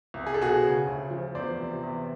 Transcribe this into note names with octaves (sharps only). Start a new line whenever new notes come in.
C2
G#4
A4
B2 F#4 G#4
C#3
D2
F3
E2 C5 D5
C3
E2